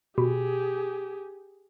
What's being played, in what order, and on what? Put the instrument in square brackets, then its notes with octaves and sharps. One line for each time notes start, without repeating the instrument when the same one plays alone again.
[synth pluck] B2 [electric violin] G4 G#4